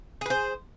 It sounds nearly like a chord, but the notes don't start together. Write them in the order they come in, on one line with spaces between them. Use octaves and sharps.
G#4 B4 C5